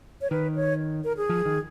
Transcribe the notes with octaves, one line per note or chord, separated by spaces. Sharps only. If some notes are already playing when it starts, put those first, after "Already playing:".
C#5
D#3 B4
C#5
A#4
G#4
F3
D#3